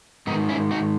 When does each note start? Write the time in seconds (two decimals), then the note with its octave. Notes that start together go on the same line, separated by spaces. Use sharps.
0.27 G#2 D#3 B3 D#4
0.49 C#4 E4
0.71 D#4 F#4